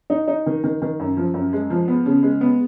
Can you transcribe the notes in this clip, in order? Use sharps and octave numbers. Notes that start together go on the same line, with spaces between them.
D#4
D#4
D#3
D#3
D#3
F#2
F3
F#2
G#3
F3
B3
C#3
G#3
B3